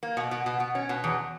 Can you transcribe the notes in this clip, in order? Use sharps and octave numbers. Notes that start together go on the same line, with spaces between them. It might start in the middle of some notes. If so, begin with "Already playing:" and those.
A#3
B2
B2
B2
B2
C#4
B2
E2